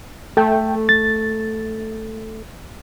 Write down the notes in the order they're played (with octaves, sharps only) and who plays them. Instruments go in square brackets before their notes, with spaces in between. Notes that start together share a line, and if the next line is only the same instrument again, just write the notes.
[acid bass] A3 [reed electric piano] A4 G5
[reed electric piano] A6